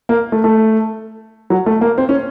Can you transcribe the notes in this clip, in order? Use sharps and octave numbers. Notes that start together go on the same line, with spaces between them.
A#3
A3
A3
F#3
A3
A#3
C4
C#4